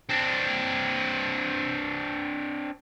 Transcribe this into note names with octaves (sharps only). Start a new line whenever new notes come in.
C4 D4